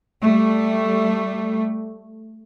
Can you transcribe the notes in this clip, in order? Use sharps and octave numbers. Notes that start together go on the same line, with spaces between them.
G3 A3